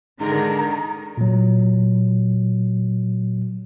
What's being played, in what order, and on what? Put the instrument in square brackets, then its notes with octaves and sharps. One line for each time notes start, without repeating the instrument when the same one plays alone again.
[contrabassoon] G#2 [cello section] D3 D#3 [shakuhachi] A#5
[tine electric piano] A#2 F#3